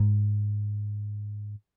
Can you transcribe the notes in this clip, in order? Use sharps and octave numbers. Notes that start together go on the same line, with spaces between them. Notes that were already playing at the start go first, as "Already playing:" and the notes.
Already playing: G#2